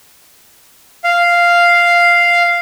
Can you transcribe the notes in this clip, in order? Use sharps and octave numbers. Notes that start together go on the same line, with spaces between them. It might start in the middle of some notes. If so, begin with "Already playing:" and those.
F5